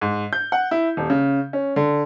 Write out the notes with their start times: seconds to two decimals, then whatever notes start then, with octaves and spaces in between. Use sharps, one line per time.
0.01 G#2
0.33 G6
0.52 F#5
0.71 E4
0.97 D#1
1.10 C#3
1.53 C#4
1.76 D3